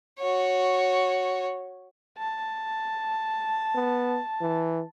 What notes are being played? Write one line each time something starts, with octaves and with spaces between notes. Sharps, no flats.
F#4 C#5
A5
B3
E3